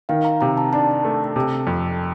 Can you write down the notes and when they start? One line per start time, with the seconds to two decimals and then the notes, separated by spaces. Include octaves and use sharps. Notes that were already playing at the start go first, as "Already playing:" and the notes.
0.09 D#3 F5
0.25 A#5
0.41 C3 A#5
0.57 A5
0.73 D4 A5
1.05 A3
1.36 C3
1.67 F2